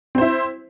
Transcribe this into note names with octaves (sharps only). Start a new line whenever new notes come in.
C4 E4 C5